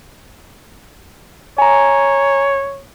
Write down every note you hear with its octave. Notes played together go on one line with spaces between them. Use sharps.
C#5 G#5 A#5